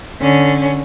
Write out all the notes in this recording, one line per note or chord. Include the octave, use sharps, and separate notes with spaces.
D3 C#4